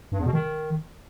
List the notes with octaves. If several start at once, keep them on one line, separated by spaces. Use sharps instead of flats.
G2
E2
B2
D#3